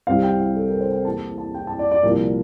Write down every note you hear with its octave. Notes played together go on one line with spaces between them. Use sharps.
C2 C3 G3 C4 E4 F5
G5
F5
A4
A#4
C5
G5
E2 E3 A#3 E4 A5
A5
G5
A5
D5
D5
C2 A#2 F3 A#4